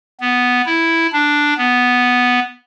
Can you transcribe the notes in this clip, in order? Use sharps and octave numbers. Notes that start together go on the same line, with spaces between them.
B3
E4
D4
B3